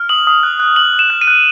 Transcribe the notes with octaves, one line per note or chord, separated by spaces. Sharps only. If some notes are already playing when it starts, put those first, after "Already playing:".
Already playing: F6
D#6 F#7
D#6
F#6
F#6
D#6 F#7
D#6
E7
F#6
D#7
F#6